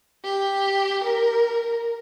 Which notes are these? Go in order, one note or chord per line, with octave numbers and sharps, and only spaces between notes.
G4
A#4